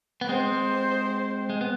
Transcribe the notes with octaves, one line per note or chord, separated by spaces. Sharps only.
B3
G#3 C4 C5
G#3
B3